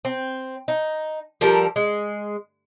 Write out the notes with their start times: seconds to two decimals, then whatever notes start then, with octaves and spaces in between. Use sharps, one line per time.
0.05 C4
0.68 D#4
1.41 F3 G3 A4 A#4
1.76 G#3